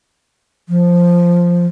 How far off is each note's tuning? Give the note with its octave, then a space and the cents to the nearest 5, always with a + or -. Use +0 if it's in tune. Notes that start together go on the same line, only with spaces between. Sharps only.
F3 +0